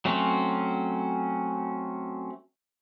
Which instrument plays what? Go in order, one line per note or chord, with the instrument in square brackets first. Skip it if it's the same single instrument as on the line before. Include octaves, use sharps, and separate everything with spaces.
[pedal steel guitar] F#3 A3 C4 C#4